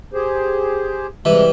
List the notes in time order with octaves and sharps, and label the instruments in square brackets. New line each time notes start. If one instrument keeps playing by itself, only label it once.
[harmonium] G4 G#4 C5
[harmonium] C3 G#3 [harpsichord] E3 G3